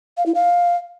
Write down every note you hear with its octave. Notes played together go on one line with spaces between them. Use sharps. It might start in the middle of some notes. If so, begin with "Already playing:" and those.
F5
E4
F5